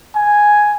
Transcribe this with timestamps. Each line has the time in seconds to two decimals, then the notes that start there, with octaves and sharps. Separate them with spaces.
0.16 G#5